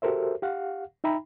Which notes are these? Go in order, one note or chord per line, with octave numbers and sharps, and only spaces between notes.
F#4 G4 A4 A#4 C5 E5
G4 F5 F#5
D#4 E5 G5 A#5 B5